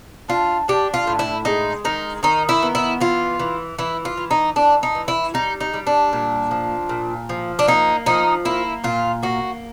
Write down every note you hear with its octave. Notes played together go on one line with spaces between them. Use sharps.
D4 F4
D4 G4
F4
A2
E4
G#3 D#4
D#3 D#4
D#3 D#4
E4
B3
E4
E3 F4
E3
E3 E4
F4
E3
D#4
E3 D4
D#4
E3
E4
G3 D#4
D#4
G3
D4
A#2
F3
A#2
F3
D4
A#3 D#4
F3 D#4
A#3 E4
A#2 F4
A#3 F#4